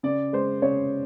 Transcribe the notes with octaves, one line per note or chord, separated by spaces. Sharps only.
C#3 D5
G#3 C5
C#3 C#5